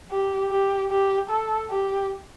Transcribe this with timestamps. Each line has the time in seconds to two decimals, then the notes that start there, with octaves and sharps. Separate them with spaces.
0.11 G4
0.50 G4
0.91 G4
1.30 A4
1.70 G4